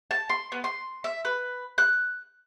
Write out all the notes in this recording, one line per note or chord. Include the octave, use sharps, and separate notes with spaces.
A5
C6
B3
C6
E5
B4
F#6